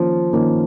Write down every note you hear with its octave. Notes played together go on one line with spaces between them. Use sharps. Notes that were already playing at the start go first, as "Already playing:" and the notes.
Already playing: D#3 F3 A#3 C#4
D#3 A#3 C#4